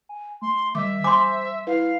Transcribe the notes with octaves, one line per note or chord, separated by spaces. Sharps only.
G#5
A3 C6
D#3 G3 E5 D6
C5 G#5 C6 D6
E4 B4 F5